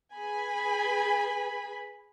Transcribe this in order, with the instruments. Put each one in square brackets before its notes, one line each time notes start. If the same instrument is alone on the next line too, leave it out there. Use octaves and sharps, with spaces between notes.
[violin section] G#4 B4 G#5 B5